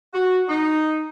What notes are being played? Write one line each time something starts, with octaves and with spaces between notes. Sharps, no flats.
F#4
D#4